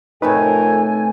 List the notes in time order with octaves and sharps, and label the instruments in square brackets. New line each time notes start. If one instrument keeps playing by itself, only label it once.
[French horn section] F2 A#4 [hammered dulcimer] A2 C3 A3 [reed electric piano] D#4 B4 [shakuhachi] G#5